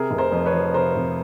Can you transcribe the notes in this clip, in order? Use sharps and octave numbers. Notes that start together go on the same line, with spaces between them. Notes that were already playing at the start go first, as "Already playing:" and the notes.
Already playing: C3 G#4 A#4
F1
A#4 C5
F2
B4 C#5
F3
C3 A#4 C5
F1